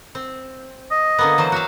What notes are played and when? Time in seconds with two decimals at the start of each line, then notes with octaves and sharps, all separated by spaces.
0.15 C4
0.91 D#5
1.18 D3 A#3 B3
1.38 E3 F#3 C5
1.52 F#4 E5 F5